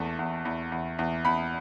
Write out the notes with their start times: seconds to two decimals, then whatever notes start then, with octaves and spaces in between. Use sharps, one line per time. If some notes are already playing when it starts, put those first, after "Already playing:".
Already playing: E2 A3 A5
0.19 E2
0.45 E2
0.72 E2
0.99 E2
1.25 E2 B5